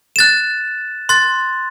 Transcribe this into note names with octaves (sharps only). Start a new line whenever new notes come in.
F#6 A6 E7
C6 F#6 A6